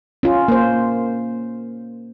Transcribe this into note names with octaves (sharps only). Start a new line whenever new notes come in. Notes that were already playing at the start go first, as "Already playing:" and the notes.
C#4 F4
A#3 C5